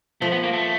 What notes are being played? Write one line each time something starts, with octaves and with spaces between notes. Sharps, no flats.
F3 A3
B3
A#3
A3